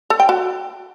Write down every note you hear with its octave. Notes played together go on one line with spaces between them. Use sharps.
A4
G5
F#4